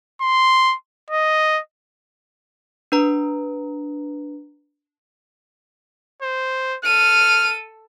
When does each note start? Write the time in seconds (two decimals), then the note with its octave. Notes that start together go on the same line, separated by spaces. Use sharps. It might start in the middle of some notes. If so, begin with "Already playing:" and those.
0.21 C6
1.10 D#5
2.92 D4 B4 A#5
6.22 C5
6.85 A4 F6 D#7